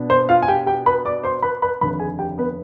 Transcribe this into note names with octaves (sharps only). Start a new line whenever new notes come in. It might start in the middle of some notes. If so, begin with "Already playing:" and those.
Already playing: B2 B3 D4
C5 C6
F4 F5
G#5
G4 G5
G4 G5
B4 B5
D5 D6
C5 C6
B4 B5
B4 B5
F1 D#2 D3 B4 B5
G#4 G#5
G4 G5
B3 B4